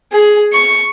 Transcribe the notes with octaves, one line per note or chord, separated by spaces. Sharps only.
G#4
C#6